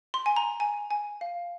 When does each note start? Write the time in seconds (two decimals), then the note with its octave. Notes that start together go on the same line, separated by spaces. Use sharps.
0.14 C6
0.26 G#5
0.36 A#5
0.60 G#5
0.91 G#5
1.21 F5